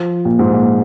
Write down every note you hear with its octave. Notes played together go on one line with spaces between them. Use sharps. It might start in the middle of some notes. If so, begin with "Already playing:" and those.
Already playing: F3
A#2
G#2
A#2